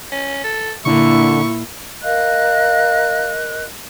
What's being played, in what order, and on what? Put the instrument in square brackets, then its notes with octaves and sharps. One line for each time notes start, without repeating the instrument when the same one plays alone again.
[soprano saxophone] C#4
A4
[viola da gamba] A#2 [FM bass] D3 [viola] E4 [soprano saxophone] C#6
[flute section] A#4 D#5 F#6 [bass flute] F5